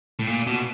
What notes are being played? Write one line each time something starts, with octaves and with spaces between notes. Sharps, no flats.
A2
A#2
B2